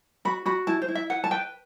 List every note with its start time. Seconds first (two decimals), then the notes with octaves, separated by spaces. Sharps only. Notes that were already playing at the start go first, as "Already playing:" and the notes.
0.25 F#4 B5
0.46 F#4 B5
0.67 E4 A5
0.82 C5
0.88 E4
0.95 E5
1.10 B4 F#5
1.24 A5
1.31 B4 G5